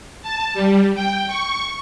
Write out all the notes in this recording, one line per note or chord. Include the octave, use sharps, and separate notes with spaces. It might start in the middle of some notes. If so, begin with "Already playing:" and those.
A5
G3
G5
C#6